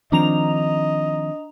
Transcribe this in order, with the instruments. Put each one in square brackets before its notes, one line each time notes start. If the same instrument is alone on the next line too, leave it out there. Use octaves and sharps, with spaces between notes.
[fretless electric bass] D#3 F3 C4 [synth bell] D4 A#5 F7 [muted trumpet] D#5